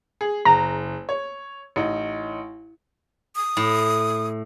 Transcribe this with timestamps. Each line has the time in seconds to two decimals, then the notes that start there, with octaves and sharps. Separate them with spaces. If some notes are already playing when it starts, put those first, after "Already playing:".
0.21 G#4
0.45 F#1 A#5
1.09 C#5
1.76 A1 D#4
3.36 D#6
3.57 A2